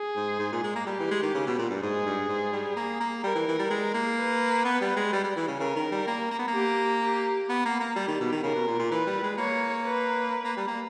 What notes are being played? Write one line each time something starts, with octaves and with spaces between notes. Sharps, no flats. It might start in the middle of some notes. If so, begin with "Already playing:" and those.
Already playing: G#4
G#2
G#2
A#2
G#3
A#3
G3 G4
E3
G#3
D#3
C#3
B2
A#2
G2
G#2 G#4
G2
G#2
G3
A#3
A#3
G3 A#4
E3
E3
G3
G#3
A#3
B4
B3
G3
G#3
G3
G3
E3
C#3
C#3 A#4
D#3
G3
A#3
A#3
B3
A#3
G4
G4
B3
A#3
A#3
G3 G4
D#3
B2
D#3
C#3 A#4
B2
A#2
A#2
E3 B4
G3
G#3
A#3 C#5
B4
A#3
G3
A#3